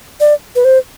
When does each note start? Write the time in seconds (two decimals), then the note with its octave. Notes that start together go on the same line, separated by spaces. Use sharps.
0.20 D5
0.55 B4
0.64 C5